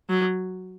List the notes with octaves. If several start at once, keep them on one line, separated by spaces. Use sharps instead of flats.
F#3